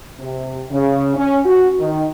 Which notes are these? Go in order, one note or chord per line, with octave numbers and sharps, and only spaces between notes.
C3
C#3
C#4
F#4
D#3